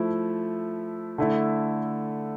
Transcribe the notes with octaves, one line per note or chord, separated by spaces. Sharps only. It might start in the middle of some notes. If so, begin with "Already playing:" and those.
Already playing: F3 A3 E4
D3 A3 E4